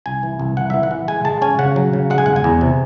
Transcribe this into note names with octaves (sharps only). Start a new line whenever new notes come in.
C2 G#5
E3
C2
E3 F#5
E3 E5
F#5
E3
G#3 G#5
G#3 A5
C#4 G#5
C#3 F#5
F#3
C#3
G#3 F#5
G#5
E2 F#5
G#5
E2
C3